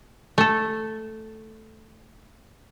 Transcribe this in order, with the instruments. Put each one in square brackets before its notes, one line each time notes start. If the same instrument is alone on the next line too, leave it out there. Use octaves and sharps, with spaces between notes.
[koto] A3 A4